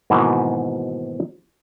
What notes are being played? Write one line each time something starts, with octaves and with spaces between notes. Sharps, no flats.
G#2 B2 D#3 E3 A#3 F#4